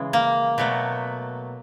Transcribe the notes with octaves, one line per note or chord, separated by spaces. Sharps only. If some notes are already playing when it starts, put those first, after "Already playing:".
Already playing: C#3 E3 G#3
A#3
B2 F#3 A3